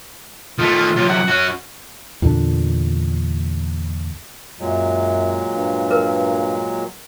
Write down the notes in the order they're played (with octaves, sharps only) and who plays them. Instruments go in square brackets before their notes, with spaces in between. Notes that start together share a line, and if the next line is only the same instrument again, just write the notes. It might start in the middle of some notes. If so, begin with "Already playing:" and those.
[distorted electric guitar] D#3 A3 [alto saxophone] F4
[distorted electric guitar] F#2 C3 [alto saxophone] F4
[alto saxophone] F#5
[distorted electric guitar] C#4 F#4
[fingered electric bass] E2 A#2 D3 D4
[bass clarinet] F#2 [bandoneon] A#2 F#3 G#3
[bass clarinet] G2
[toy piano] A#4 B4